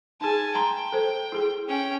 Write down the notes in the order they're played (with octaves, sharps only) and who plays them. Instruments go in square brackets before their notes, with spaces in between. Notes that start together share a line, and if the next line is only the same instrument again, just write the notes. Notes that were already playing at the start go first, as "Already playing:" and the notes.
[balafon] D#4 G#4 [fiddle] G#5 A5
[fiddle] G5 [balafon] A5 A#5 C6
[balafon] A4 C5
E4 G#4
[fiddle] C#4 G5